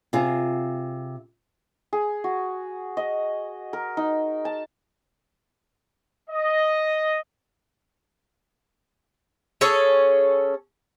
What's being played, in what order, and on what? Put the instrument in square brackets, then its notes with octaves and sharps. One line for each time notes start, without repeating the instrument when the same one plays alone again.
[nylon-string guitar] C3 C4 F4 G#4
[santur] G#4
F#4
D#5
A#4
D#4
A5
[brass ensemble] D#5
[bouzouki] C#4 G#4 A4 C#5